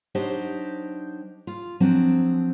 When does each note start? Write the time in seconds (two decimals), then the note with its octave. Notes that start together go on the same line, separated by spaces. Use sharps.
0.15 F#3 D4 D#4 G4 C5 D#5
1.47 F4
1.80 F3 F#3 C4 D4